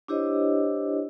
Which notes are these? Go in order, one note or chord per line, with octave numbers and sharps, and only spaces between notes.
D4 E4 G4 C5 C#5 D#5